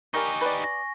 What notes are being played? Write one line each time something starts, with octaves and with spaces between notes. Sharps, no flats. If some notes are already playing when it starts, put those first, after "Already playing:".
G3 D#4 G4 A#4 G#5 C#6
B4 D5
A#6